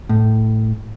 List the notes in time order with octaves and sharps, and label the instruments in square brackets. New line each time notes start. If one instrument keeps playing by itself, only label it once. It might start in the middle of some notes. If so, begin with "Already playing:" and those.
[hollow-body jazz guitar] A2